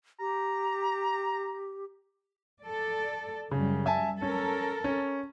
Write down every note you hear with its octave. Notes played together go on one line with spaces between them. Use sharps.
G4 A#5
A4 D5
F#2 C#3 G3
E5 G#5 A5
C#4 A4 A#4
C#4